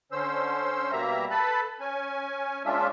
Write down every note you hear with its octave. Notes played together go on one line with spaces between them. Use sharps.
D3 C#4 C5 E6
B2 G3 A#3 E5 A#5
A4 B4 A5 B5
C#4 G#5
A#2 G#3 C#4 D4 F4 E5